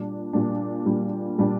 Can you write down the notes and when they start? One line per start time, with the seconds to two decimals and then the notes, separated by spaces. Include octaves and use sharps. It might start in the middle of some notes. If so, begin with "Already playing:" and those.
Already playing: A#2 G3 D4
0.33 A#2 G3 D4
0.85 A#2 G3 D4
1.38 A#2 G3 D4